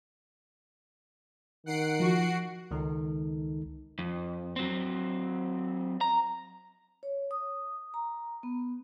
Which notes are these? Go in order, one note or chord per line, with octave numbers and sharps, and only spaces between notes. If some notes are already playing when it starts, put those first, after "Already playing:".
D#3 F#5 C7 D7
F3 F#4
C#2 D#3 D#4 A4
F2
F#3 C4
A#5
C#5
D#6
A#5
B3